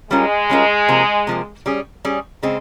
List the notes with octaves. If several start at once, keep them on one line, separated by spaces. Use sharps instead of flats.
G3 G#3 C#4 F4 A#4
G3 C#4 F4 A#4
C3 F3 A#3
C3 F3 A#3
G3 C#4 G#4
G3 C#4 G#4
C#3 G#3 C4